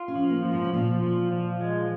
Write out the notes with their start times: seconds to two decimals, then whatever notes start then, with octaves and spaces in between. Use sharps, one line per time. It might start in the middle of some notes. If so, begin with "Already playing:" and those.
Already playing: F4
0.08 C#4
0.15 F3
0.30 A#3
0.45 F3
0.52 G#2
0.64 C#3
0.74 A#2 F3
1.02 F3
1.32 F3
1.61 G#3